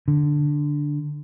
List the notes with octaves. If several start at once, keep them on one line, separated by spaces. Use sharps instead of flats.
D3